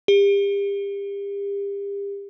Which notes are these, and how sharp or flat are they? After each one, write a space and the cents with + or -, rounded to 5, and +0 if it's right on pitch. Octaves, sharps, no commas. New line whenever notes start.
G4 +35